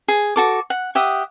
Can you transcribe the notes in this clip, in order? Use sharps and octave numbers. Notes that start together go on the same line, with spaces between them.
G#4
F#4 A4 D6
F#5
G4 E5 F#5 D#6